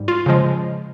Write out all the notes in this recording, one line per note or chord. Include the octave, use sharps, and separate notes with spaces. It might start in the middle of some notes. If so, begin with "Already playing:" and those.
Already playing: G#2 G3
F4
C#3 F3 G#3